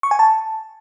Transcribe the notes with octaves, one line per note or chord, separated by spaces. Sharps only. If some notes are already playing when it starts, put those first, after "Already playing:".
C#6
G#5
A5